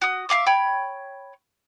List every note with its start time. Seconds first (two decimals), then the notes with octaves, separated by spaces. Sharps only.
0.01 F#4 D#6
0.29 E5 F5 D6 F6
0.46 C#5 G5 B5